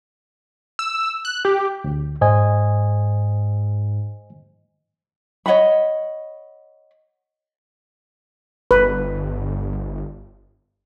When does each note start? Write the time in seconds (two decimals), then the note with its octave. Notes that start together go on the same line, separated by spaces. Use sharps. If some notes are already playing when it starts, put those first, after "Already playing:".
0.79 E6
1.25 F#6
1.45 G4
1.84 D2
2.21 G#2 C5 D#5 G#5
5.46 C#5 D#5 F#5 B5
8.71 G1 B4